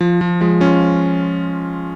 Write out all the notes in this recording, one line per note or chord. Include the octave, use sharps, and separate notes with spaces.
F3
F3
F3 G#3
C#4 F4